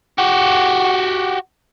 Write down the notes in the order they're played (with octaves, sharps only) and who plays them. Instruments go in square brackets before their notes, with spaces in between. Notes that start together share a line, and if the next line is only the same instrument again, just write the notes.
[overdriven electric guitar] F#4 G4